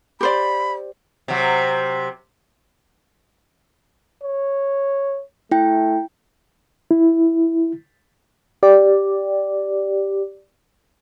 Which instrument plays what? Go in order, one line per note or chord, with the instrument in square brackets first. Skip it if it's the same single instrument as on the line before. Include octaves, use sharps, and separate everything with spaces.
[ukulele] G4 C5 D5 [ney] B5
[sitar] C3 F#3
[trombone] C#5
[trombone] A3 [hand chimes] E4 G5
[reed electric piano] E4
[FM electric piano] G4 D5